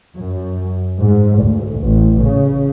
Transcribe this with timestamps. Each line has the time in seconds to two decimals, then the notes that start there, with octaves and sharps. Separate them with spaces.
0.16 F#2
1.00 G#2
1.42 D2
1.79 A1
2.21 C#3